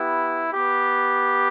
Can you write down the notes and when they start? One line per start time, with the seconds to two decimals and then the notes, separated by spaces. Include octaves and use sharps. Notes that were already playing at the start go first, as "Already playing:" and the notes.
Already playing: B3 E4 G4
0.53 B3 G4